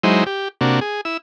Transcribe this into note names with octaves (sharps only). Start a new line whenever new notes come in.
F#3 G#3 D#4 E4 C5
G4
C3 A#3 D4 F#4
G#4
E4 E6